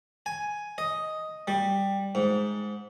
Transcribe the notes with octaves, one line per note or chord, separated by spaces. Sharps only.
G#5
D#5
G3
G#2